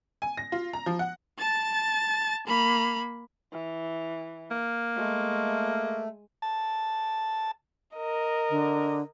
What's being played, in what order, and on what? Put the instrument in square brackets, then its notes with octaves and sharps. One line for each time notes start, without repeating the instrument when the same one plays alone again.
[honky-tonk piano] G#5
A#6
F4
A#5
F3
F#5
[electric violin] A5 A6
A#3 B5
[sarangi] E3
[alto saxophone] A#3
[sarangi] G#3 [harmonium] A3
[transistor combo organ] A5
[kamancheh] A#4 D#5
[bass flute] D3